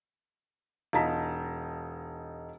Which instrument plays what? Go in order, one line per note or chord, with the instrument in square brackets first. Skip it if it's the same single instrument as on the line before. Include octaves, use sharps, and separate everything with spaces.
[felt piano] E1 D#4 F4 A5 A#5 B6